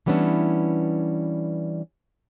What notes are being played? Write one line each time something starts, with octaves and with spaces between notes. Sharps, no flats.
E3 G3 B3 C#4 D4 E4